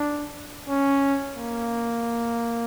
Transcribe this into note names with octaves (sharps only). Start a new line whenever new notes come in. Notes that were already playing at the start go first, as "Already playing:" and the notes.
Already playing: D4
C#4
A#3